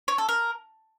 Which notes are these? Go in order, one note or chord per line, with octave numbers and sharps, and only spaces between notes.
C#5
A4
A#4